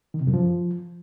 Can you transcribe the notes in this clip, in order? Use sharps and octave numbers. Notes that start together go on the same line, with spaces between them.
D#3
C3
F#2
F3